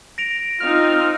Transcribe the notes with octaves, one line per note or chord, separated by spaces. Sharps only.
A#6 D7 F7
C4 D#4 F4 F6